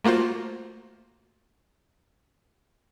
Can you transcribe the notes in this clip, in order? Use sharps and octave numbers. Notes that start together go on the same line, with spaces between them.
A3 A#3 F4 F#4 C5